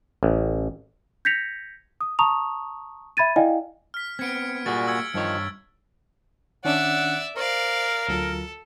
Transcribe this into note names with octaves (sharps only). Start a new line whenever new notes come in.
A1
G6 G#6 A#6 B6 C#7 F7
D#6
A5 A#5 C#6 D#6 F7
E5 B5 G#6 A6 D#7
E4 D5 D#5 F5 G5 G#5
F6 B6
B3 C4 G#6 C#7 D7
A#2 G3 A#3 F#4 G#4 A6
E6 G#6 C#7
G2 D#3 F3 C#5
D#3 C#4 D4 D5 E5 F#5
A#4 C5 D5 F5
D2 F#3 F4 A4